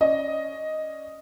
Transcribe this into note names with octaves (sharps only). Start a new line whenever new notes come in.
C#4 D5 D#5